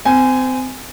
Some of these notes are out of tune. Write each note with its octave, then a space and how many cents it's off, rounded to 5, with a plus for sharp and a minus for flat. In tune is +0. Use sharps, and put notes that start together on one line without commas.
C4 -30 G#5 +0